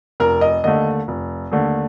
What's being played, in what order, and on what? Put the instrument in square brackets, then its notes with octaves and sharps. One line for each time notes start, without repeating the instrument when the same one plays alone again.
[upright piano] F1 A#4
D#5
D#2 D3 A3 D#5
F1
D#2 D3 A3